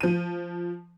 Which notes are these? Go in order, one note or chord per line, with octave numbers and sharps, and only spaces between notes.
F3 D#7